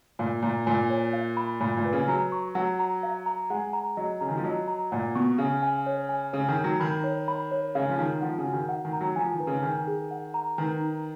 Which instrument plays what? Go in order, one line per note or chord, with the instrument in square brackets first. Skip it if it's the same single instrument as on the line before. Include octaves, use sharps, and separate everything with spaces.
[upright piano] A#2 [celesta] F5
[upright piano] A#2 [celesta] A#5
[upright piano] A#2 [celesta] G#5
[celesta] C#5
F5
B5
[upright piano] A#2 [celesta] B5
[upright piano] A#2
[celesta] B4
[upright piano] C#3
[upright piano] F#3 [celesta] A#5
[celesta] C#6
[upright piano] F#3 [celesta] F#5
[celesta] A#5
F5
A#5
[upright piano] G#3 [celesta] F#5
[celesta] A#5
[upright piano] F#3 [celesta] D#5
[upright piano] C#3 [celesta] A#5
[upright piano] D#3
F3
[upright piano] F#3 [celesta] D#5
[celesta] A#5
[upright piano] A#2 [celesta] F#5
[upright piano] B2 [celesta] C#6
[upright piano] C#3 [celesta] F5
[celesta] G#5
C#5
G#5
[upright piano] C#3 [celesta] C#5
[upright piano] D#3
[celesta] D#4
[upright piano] F#3
[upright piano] D#3 [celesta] B5
[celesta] C#5
B5
C#5
[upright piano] C#3 [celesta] F5
[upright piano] F3
[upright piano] D#3 [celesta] D#4
[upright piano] F3 [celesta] F#5
[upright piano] C#3
[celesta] F#4
[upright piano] D#3
[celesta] F#5
[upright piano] D#3
[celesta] A#5
[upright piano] F#3
[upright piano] F3 [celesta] G#5
[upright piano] D#3
[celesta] B4
[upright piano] C#3
[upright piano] D#3 [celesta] G#5
[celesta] G#4
F#5
A#5
[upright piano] D#3 [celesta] B4
[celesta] D#4